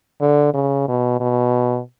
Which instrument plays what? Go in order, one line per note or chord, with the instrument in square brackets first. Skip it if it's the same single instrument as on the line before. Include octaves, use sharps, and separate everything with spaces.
[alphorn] D3
C#3
B2
B2